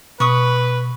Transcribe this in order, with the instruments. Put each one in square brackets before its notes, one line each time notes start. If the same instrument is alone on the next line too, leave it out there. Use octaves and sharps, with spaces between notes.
[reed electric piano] B2 [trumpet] B4 [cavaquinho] C#6 D#6